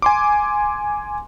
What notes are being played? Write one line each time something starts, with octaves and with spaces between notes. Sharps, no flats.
G#5 C6 D6